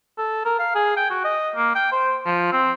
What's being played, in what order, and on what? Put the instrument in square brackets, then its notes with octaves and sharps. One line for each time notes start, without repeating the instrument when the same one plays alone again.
[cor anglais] A4
A#4
F5
G#4
G5
F#4
D#5
A#3
G5
C5
F3
C4